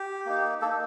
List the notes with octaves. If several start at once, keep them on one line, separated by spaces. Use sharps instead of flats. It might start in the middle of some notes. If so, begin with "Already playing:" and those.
Already playing: G4
A#3 D#4
A#3 D#4 A4